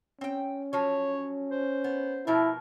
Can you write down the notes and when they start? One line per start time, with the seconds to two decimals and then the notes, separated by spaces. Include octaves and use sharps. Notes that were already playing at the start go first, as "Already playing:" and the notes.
0.21 C4 C#4 G5
0.73 F3 F#3 C#5
1.51 C5
1.84 B3
2.27 B2 F3 E4 A#4